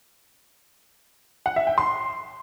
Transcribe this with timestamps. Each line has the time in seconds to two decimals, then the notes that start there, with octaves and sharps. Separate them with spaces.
1.46 F#5
1.56 E5
1.67 G5
1.78 C6